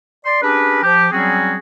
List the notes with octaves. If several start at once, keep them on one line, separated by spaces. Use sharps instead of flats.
D5 C6
C#4 D4 G4 G#4 A#4 B4
F3 G4
F#3 G3 C4 C#4 F#4 G#4